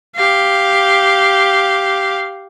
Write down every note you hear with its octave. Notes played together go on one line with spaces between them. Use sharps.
G4 F5